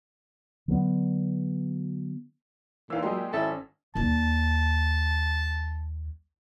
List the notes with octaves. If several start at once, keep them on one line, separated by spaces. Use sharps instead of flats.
D3 F#3 G#3 B3
A#2 E3 D#4 F5 E6
F#3 G#3 G4 C6 D#6
G#1 C#4 E4 A4 G#5
D#2 G3 A5